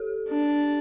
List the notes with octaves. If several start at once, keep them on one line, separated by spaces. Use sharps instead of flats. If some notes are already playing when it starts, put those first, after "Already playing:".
Already playing: G4 A4
D4